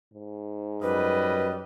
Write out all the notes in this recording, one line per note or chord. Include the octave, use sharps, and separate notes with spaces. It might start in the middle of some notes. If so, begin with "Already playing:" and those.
G#2
F#2 G3 B4 D#5